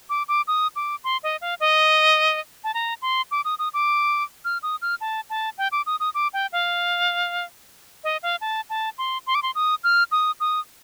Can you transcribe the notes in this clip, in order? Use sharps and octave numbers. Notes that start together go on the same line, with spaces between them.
D6
D6
D#6
D6
C6
D#5
F5
D#5
A5
A#5
C6
D6
D#6
D#6
D6
F6
D#6
F6
A5
A5
G5
D6
D#6
D#6
D6
G5
F5
D#5
F5
A5
A5
C6
C6
D6
C6
D#6
F6
D#6
D#6